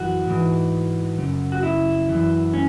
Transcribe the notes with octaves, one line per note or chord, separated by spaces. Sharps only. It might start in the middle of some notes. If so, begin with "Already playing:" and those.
Already playing: F#2 E3 F#4
G#2 E3
F#2 C#3
F#4
E4
F#2 E3
C#4